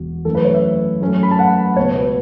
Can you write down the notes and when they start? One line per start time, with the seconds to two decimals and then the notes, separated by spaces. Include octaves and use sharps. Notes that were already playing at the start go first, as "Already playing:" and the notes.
Already playing: E1 E2 F#4
0.25 F#2 E3 A3 C#4 A4
0.35 B4
0.44 C#5
0.54 E5
1.01 F#2 F#3 A3 C#4
1.23 B5
1.31 A5
1.39 F#5
1.76 C#2 B2 B3 C#5
1.95 B4